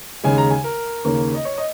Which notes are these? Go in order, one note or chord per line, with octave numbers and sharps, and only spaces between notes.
D#2 C#3 G#3 G#5
A#5
G#5
A#4
D#2 C#3 A#3 C#4
D#5
C#5
D#5